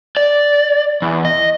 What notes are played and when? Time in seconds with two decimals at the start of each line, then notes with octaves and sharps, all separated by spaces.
0.17 D5
1.02 E2
1.25 D#5